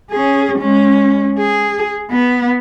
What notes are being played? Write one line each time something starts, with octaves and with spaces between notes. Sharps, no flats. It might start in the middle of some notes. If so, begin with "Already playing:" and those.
C#4 G#4
G#3 C#4
G#4
B3